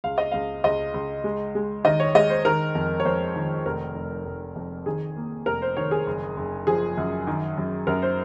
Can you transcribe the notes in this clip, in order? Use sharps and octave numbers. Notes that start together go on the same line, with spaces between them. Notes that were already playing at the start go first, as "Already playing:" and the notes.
C#2 F5
D#5
C#2 F5
C#2 D#5
C#2
G#3
G#3
D#3 D#5
C#5
G#3 D#5
C5
D#3 A#4
F2
C#5
F2 C5
D#3
F1 A#4
F1
F1
F2
D#3 G#4
A#3
F1 A#4
C5
D#3 C#5
G#4
F#1
F#1
F3 G#4
F#2
D#3
F#2
F#2 A#4
C5